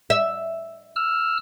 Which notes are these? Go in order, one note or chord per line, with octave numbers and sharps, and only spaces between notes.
E5
E6 F6